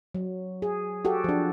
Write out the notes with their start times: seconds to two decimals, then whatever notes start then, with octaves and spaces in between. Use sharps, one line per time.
0.15 F#3
0.62 G#4
1.05 F#4 G4 A4
1.24 F3 D4